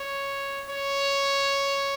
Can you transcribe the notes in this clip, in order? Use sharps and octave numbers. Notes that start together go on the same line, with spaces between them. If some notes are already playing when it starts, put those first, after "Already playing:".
Already playing: C#5
C#5